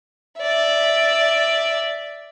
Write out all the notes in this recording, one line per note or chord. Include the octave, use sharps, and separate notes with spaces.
D5 E5